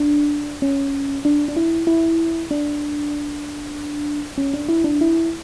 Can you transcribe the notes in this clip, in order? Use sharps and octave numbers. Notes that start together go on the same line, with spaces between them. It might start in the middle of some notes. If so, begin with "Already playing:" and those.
Already playing: D4
C#4
D4
D4
E4
E4
D4
C#4
D4
E4
D4
E4